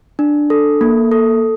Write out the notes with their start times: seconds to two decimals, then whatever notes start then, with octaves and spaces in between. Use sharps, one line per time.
0.19 D4
0.50 A4
0.81 A#3
1.12 A4